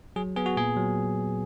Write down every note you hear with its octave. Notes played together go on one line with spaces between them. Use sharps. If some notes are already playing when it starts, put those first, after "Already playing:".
F#3 G#4
B3 G#4
F#4
A#2 G#4
F#3